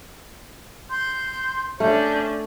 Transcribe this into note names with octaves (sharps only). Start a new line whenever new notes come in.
C6 G6
A3 C#4 D4 G6